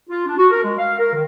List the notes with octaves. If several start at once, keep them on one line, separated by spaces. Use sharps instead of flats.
F4
D4
F#4
A#4
G#3
F5
A#4
D#3